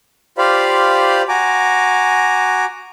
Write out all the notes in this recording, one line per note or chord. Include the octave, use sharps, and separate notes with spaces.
F4 G4 C5 D5 F5 B5
F#4 G#5 A#5 D6